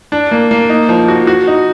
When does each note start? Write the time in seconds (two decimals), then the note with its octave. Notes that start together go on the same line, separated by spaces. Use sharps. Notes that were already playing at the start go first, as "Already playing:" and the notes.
0.12 D4
0.31 A#3
0.51 A#3
0.70 D#4
0.89 F3
1.08 F#4
1.27 F#4
1.48 D#4